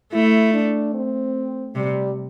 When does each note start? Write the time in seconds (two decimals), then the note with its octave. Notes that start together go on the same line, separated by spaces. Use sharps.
0.13 A3 E4
0.54 D4
0.94 C4
1.75 C3 G3